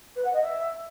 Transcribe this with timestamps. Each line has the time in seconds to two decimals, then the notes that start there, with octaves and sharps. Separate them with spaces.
0.16 B4
0.24 F#5
0.33 D#5
0.42 E5